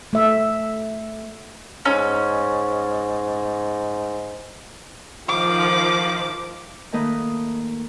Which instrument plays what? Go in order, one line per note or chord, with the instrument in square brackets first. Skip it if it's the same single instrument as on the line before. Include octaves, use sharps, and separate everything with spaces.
[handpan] A3 E5
[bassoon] G#2 [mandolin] C#4
[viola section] D#3 F3 [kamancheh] D6
[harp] D#3 A3 A#3 B4 D#5